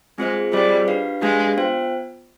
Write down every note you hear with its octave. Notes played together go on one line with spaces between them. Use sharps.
G#3 C4 F4 G#4 C5 D#5
G3 C4 F4 G#4 C5 D#5
D4 G4 B4 F5
G#3 D4 G4 B4 F5
B3 F4 C5 G5